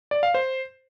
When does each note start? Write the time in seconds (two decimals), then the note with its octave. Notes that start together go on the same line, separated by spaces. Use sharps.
0.11 D5
0.23 F5
0.34 C5